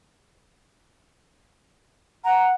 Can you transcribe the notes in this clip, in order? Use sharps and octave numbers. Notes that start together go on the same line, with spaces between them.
F#5 A#5